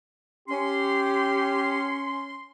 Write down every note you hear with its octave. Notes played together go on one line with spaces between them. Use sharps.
C#4 G4 C6